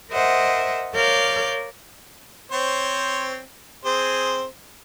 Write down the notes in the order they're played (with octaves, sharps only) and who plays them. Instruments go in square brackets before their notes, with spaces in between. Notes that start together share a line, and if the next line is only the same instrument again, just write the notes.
[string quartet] A#4 C5 D#5 E5 F#5
A#4 C#5 D5 F5 G6
[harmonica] C4 C5 C#5
C4 G#4 C5